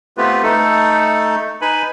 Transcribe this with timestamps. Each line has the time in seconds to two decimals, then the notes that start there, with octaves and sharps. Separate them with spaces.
0.17 A3 B3 C4 F4 G4 B4
0.43 A3 D#4 A4
1.61 D#4 B4 G#5 B5